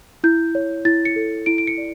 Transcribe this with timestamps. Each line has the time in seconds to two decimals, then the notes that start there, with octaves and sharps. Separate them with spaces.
0.24 E4 G6
0.55 C#5
0.85 E4 A6
1.05 C#7
1.16 A4
1.46 E4 D7
1.58 D7
1.67 C#7
1.77 D5